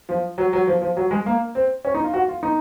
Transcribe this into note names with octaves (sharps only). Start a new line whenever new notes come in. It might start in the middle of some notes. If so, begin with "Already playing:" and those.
F3
F#3
F#3
F3
F3
F#3
G#3
A#3
C4
C#4
D#4
F4
F#4
F4
D#4